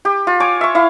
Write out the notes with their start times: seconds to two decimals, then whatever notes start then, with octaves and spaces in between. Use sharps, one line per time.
0.05 G4
0.27 F4
0.40 C#5 G#5 D6
0.61 E5 C#6
0.75 E4 F5